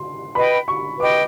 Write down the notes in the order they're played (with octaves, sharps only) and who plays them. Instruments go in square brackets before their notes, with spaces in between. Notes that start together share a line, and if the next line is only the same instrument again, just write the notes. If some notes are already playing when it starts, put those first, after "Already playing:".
Already playing: [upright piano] C6
[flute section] B4 D#5 G5 [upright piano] B5
[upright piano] C#6
[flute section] B4 D#5 G5 [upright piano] D6